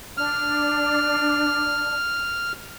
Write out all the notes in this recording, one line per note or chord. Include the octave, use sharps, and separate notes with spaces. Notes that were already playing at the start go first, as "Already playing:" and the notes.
D4 F6